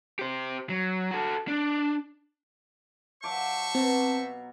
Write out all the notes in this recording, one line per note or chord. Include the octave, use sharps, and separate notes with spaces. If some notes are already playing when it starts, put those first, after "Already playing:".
G4 C5
F#3
F#4 A4
D4
F#3 C5 E5 F5 A5 C#6 D6
B2 C4 A#5